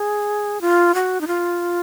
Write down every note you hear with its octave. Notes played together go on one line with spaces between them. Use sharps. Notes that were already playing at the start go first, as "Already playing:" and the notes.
Already playing: G#4
F4
F#4
D#4
F4